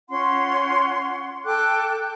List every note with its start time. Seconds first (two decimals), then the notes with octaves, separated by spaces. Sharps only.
0.09 C#4 F4 F#5 C6
1.44 A4 G5 D6 F#6